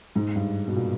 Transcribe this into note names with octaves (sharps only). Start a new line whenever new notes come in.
G#2
G2
B2
A#2